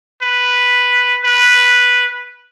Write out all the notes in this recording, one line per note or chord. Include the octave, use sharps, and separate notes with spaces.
B4
B4